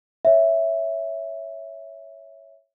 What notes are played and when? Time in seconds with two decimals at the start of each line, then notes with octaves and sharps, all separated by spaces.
0.25 C#5 E5